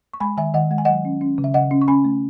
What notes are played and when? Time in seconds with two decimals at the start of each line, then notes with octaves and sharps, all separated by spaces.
0.14 C#6
0.20 G#3 G#5 B5
0.37 D#3 E5 G#5
0.54 D#3 D#5 F#5
0.71 G#3 F#5
0.78 G#5
0.85 F#3 D#5 F#5
1.05 C#4
1.21 C#4
1.38 C#3
1.44 E5
1.54 C#3 D#5 F#5
1.71 C#4
1.82 C#6
1.88 C#4 G#5 B5
2.05 A3